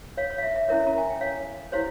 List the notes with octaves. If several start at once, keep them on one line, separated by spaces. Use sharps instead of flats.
C#5 F5
C#5
F5
E5
E5
C#4 E4 A#4 C#5 E5
A#5
G#5
G5
C#5 F5
E4 G4 C5 C#5 F5